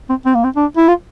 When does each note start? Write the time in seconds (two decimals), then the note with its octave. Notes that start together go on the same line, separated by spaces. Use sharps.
0.09 C4
0.25 C4
0.35 A#3
0.44 C4
0.56 D4
0.77 E4
0.88 F4